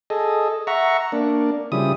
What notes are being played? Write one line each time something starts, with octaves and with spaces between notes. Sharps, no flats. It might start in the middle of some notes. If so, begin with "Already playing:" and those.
G#4 A4 D#5
E5 F#5 A#5 C#6
A#3 D4
C#3 F3 G3 E4 D#6